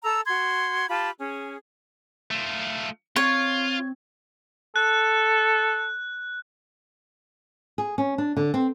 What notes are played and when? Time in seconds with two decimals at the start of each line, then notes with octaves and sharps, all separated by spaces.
0.03 A4 A#5 E6
0.26 F#4 C6 G#6
0.89 F4 G4 A5 B5
1.17 C#4 G#4
2.31 A3 F4
3.16 C4 F4 C#5
4.76 A4 F#6
7.78 G#4
7.98 C#4
8.18 D4
8.37 D3
8.54 C4